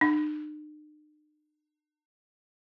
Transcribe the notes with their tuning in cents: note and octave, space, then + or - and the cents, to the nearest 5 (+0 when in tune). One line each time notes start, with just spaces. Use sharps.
D#4 -45